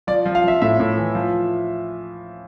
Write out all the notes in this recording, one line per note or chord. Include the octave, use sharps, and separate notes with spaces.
F3 D5
F3
F5
F3 E5
A2 E5
A2
E3
F3